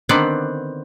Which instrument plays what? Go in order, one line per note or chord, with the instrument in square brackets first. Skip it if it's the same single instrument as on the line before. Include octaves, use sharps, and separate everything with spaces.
[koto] D3 D#3 B3 C4 D5 F#5